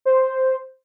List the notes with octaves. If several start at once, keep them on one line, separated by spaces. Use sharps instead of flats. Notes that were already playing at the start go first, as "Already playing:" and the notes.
C5